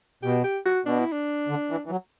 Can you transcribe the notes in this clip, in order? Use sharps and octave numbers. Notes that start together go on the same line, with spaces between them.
B2 G4
G4
F#4
B2 D4
E4
D4
D3
E3
E3
F#3